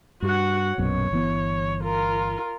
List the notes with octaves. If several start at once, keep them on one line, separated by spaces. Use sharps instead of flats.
G2 F#4 F#5
A#1 F#2 B2 C#5
G1 E3 B3
F4 A#4